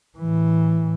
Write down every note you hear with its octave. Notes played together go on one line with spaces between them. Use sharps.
A2 E3